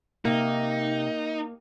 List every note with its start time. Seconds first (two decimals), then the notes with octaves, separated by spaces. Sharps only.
0.25 C3 A#3 D#4